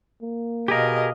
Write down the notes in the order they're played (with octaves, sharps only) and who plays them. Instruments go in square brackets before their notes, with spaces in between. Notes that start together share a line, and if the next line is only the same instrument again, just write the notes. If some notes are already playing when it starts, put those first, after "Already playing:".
[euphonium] A#3
[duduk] B2 [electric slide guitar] G4 G#4 A#4 [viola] D#5 F5